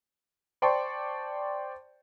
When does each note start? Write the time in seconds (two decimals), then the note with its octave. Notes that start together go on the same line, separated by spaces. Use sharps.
0.62 C5 D5 G5 A5 C6 C#6